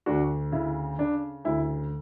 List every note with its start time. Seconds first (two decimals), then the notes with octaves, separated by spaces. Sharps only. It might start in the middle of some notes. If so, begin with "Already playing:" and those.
0.06 D2 D4 F#4
0.52 C#3 E4
0.99 C#3 D4
1.45 D2 E4